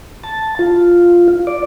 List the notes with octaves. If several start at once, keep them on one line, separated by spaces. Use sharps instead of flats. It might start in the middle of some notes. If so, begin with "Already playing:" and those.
A5
F4
D5